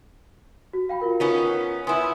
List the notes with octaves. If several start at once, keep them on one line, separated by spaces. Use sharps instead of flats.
F#4
F5 G5 B5
F4 A#4
B3 C#4 D#4
B3 E4 G#5 C6 D#6